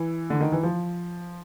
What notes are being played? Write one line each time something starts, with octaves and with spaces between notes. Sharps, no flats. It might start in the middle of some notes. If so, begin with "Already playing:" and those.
Already playing: E3
D3
D#3
E3
F3